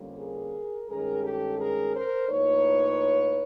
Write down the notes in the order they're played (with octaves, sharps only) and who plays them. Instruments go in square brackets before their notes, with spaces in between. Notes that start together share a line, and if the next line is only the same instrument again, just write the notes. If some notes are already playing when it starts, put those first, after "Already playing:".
Already playing: [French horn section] F2 D3 G3 A#3 C#4
G#4 A#4
G2 D#3 G#3 C#4 G#4 A#4
G4 A4
G#4 A#4
A#4 C5
A2 F3 A#3 D#4 B4 C#5